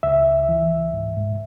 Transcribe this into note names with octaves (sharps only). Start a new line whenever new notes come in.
C#2 E5
C#2
E3
C#2
G#2
G#2